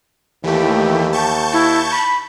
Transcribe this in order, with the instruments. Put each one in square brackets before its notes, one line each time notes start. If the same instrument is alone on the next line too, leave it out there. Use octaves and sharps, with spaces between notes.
[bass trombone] D#2 [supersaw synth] E3 A3 [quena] G4
[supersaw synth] A5 C#6 G6
[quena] E4
B5